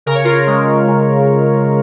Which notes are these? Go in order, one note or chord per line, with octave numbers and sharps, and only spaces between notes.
C#3 A#4
C#5
F4 A#4
G#3
C#3